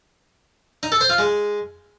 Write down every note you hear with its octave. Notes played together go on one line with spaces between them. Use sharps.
D#4
A4
C5
F4
G#3